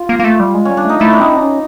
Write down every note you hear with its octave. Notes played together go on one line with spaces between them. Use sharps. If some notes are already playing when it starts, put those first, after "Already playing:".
Already playing: F4
A#3
A#3
A3
G3
G#3
G3 C#4
D4
A3 D#4
A3 E4
D4
C4 D#4
D4
C#4